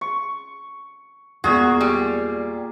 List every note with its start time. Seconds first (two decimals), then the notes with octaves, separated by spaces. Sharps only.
0.01 C#6
1.44 E2 A#2 G#3 B3 F#4 G#4
1.81 G3